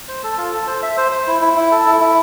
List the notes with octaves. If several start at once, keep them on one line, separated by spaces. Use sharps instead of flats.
C5
A4
F4
A4
C5
E5
C5
C5
E4
E4
E4
A4
E4
E4